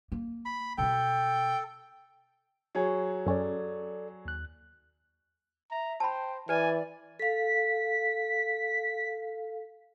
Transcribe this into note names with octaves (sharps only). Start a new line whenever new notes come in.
A#3
B5
B2 B3 A4 G5
F#3 G#4 C#5
F#2 C#4 A4 D5
D#2 F#6
E5 A#5
C5 G5 A5 B5
E3 B4 D5 G#5
A4 F5 B6